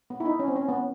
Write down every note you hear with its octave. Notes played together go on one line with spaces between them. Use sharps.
B3
E4
D#4
C#4
C4
C#4
B3